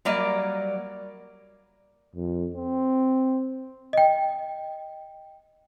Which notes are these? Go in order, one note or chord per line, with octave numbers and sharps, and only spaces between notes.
F#3 G3 A#3 D5 D#5
F2
C4
D#5 G5